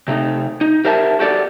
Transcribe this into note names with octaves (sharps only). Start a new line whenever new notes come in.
C3 A3 D#4
D#4
G4 A#4 C5 E5 A5
F#4 G4 A4 D5